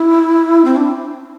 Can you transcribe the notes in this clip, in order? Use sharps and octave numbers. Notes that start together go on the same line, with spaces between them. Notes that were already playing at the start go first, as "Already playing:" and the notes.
Already playing: E4
C4
D4